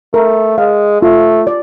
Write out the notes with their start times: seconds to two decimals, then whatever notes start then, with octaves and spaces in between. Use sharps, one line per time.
0.14 A3 A#4
0.58 G#3 F5
1.02 A3 F4
1.47 D5